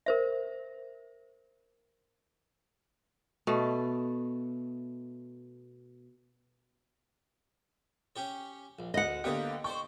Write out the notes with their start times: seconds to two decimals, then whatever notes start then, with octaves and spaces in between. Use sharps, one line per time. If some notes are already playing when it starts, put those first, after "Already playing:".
0.06 A#4 C5 E5
3.47 B2 A3
8.16 C#4 G4 C#5
8.79 A#1
8.94 D2 D#5 F#5
9.24 D3 A#3 B3 G4 C#5 D#6
9.64 C5 D5 G5 C#6